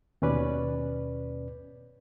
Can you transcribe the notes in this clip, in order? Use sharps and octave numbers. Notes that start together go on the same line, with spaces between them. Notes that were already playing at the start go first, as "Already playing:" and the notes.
D#2 B2 C#4 B4 D5